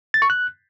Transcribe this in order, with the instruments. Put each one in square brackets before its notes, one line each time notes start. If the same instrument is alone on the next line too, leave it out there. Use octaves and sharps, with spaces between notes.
[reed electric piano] A6
C#6
F#6